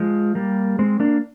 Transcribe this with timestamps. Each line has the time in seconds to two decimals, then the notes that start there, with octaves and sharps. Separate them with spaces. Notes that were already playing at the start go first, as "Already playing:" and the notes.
Already playing: F3 G#3
0.35 G3 A#3
0.79 G#3 C4
1.00 A#3 D4